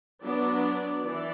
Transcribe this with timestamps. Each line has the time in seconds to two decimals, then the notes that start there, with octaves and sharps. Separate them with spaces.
0.22 F#3 B3 D4 D5
1.02 E3 D5